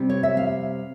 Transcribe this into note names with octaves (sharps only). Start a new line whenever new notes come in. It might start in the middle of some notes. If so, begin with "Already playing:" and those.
Already playing: C3 G3
C#5
E5
F5